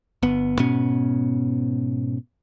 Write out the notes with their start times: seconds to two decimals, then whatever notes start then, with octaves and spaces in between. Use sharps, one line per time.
0.23 G1 B3
0.59 G#2 B2 B3 C#4